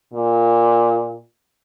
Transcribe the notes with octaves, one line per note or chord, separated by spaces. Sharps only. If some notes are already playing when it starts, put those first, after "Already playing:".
A#2